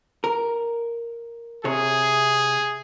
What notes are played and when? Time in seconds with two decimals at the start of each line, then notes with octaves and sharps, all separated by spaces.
0.24 A#4
1.65 C3 G#4 C#5